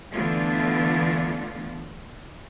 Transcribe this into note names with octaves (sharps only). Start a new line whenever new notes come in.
D3 E3 A3 B3 D4 F4